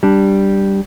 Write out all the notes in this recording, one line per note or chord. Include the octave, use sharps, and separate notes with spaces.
G3 D4